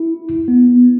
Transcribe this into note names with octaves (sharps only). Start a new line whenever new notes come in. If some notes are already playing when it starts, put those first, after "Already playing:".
Already playing: E4
B3